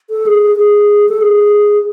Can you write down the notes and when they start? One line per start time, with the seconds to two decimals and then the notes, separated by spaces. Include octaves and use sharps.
0.10 A4
0.26 G#4
0.57 G#4
1.09 A4
1.21 G#4